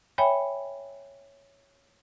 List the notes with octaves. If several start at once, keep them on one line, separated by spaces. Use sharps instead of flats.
C#5 E5 G5 G#5 B5